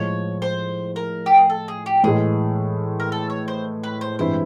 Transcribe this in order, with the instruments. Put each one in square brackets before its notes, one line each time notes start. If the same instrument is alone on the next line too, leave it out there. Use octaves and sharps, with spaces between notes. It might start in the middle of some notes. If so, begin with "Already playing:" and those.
Already playing: [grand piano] A2 F3 G#3 [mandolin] C#5
[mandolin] C5
A#4
G4
G#4
A4
G#4
G4
[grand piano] A2 E3 G#3 [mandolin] G#4
[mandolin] A#4
A4
C#5
C5
B4
C5
[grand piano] G2 E3 G#3 C4 E4 [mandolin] C5